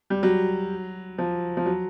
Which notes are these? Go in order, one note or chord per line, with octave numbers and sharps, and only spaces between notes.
G3
F#3
F3
F3
F#3